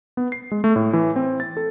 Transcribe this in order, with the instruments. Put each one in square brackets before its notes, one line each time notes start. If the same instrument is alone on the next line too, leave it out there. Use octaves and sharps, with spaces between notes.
[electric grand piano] B3
C7
G#3
A3
A2
E3
C4
A6
A4